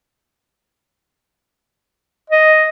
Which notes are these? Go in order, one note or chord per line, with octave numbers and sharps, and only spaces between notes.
D#5